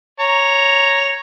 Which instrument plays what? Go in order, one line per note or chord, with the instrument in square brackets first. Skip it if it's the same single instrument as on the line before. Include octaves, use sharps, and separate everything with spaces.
[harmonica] C#5 A#5